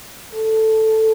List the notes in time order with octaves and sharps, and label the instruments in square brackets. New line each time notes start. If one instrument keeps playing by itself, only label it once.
[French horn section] A4